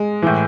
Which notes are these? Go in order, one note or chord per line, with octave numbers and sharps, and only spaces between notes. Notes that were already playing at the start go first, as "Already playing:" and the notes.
Already playing: G#3
A2 E3